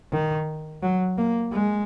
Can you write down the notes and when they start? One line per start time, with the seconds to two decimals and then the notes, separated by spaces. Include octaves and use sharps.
0.13 D#3
0.83 F#3
1.18 A#3
1.53 G#3